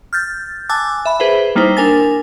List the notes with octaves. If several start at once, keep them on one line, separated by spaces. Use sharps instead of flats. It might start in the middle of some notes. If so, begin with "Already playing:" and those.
F6 G6 A6
G#5 A5 D6 E6 F#6 A6
E5 B5
G#4 B4 C5 E5
G3 A#3 D#4 E4 C5
D4 A#4 G#5 A6